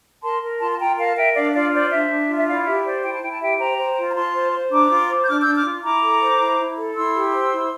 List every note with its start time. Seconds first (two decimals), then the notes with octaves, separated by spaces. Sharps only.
0.23 A#4 A5 C6
0.42 A#4
0.60 F4 A5 C6
0.72 A5
0.79 F4 G5 A#5
0.98 A#4 F5 A5
1.16 A#4 E5 G5
1.35 D4 D5 F5
1.54 F4 D5 F5
1.73 C5 D5
1.91 D4 E5
2.10 D4
2.29 F4
2.37 E5
2.48 E4 D5 F5
2.66 G4 E5
2.84 C5 D5
3.03 E4 G5
3.13 A5
3.22 E4 G5
3.32 A5
3.41 G4 E5 G5
3.59 C5 G5 A#5
3.78 C5
3.97 F4
4.11 A#5
4.15 F4 A5 C6
4.34 C5
4.53 C5
4.72 D4 A#5 D6
4.90 F4
5.09 C5
5.24 G6
5.27 D4 D6 F6
5.41 D4 E6 G6
5.55 D6 F6
5.65 F4
5.83 E4 A#5 D6
6.02 A4
6.21 C5
6.40 E4
6.58 E4
6.77 A4
6.95 E4 C6 E6
7.15 G4
7.33 C5
7.52 E4